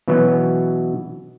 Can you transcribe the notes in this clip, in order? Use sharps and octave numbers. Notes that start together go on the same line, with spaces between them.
B2 E3 F#3 B3 C#4